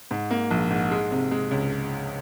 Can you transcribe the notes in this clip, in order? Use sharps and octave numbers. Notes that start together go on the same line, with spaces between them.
G#2
A#3
A#1
G#2
G#3
C3
G#3
C#2